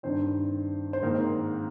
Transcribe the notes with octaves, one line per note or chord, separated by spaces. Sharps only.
G2 D#3 C4 C5
C5
G#2 D#3 A#3 A#4
C4 C5